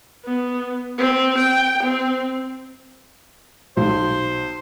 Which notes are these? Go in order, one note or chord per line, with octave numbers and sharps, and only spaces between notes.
B3
C4
G5
C4
B1 C5